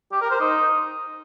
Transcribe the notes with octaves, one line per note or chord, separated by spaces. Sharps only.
G4
A#4
C5
D#4